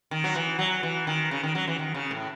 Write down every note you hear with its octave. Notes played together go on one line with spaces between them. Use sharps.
D#3
F#3
E3
F#3
E3
D#3
C#3
D#3
F#3
E3
D#3
C#3
A2